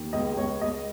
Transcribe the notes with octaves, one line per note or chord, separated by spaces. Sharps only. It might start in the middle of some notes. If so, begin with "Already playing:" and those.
Already playing: D#2
C#2 D#5
C#2 C#5
C#2 D#5